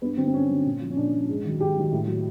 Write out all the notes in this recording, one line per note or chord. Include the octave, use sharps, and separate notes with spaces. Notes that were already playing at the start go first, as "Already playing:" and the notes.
G2 B3
D3 F#3 C4
C4
G2 C#4
D3 F#3
A#2
F3
C#4
A#2 D4
F3
G#2
D#3 F#3
G#2 G4
D#3 F#3
A2
F#3